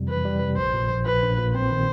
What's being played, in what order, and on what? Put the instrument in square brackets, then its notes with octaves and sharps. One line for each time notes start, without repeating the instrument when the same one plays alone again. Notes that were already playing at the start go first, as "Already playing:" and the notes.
Already playing: [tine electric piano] F2 C3 G3
[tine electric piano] E3 [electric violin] B4
[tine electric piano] G3
C3
[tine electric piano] A#1 [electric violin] C5
[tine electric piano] A#2
A#1
[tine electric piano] F3 [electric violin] B4
[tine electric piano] A#1
A#2
[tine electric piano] C4 [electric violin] C5
[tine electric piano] D#3